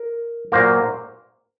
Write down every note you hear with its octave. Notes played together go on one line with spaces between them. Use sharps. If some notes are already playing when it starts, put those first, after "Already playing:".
Already playing: A#4
A#2 F#3 A#3 A#4 C5